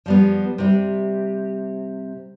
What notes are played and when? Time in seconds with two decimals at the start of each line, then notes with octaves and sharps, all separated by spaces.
0.06 F3 G3 B3
0.58 C3 G3